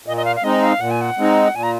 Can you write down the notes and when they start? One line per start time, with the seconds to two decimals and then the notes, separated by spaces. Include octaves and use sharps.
0.06 A#2 D#5
0.17 D#5
0.25 F5
0.36 F5
0.43 G#3 C4 D#4 D#5
0.62 F5
0.80 A#2 F#5
0.91 G#5
1.01 F#5
1.19 G#3 C4 D#4
1.55 A#2 G#5
1.63 A#5